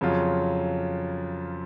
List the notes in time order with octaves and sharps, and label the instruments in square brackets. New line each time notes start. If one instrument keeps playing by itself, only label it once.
[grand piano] F2 C#3 F#3 C#4 F4